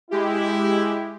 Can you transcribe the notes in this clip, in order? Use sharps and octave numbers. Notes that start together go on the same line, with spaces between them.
G#3 E4 G4